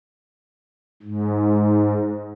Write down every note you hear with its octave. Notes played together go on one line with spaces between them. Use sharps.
G#2